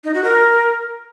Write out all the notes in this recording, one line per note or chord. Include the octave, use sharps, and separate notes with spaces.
D#4
F#4
A#4